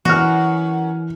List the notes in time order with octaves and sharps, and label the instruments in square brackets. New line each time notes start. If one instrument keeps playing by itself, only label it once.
[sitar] F#2 [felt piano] E3 F6 [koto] F#4